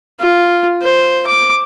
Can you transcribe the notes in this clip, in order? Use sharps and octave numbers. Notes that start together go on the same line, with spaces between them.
F4
C5
D6